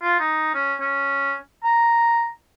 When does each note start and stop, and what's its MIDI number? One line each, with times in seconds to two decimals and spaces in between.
0.03 0.19 65
0.20 0.51 63
0.55 0.75 61
0.81 1.35 61
1.64 2.28 82